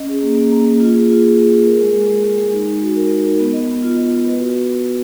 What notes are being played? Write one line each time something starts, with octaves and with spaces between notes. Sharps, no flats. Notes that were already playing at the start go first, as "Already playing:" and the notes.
Already playing: C#4 D#5
G#4
A#3
A#3
A#3
A#3
F4
G#4
F4
G#4
G#4
G#4
A#4
G#3
G#3
G#3
G#3
G#3
D#4
D#4
F#4
A#4
D#4
A#4
B3
D#5
B3
F4
D#5
B3
B4
F#4